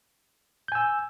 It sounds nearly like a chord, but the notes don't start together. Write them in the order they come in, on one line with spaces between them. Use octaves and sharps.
G6 G#5 E6